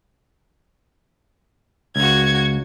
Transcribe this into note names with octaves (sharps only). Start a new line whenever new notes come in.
C#2 F#4 G#6